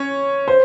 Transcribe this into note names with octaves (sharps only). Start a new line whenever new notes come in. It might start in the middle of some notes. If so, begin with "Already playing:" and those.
Already playing: C#4 C#5
C5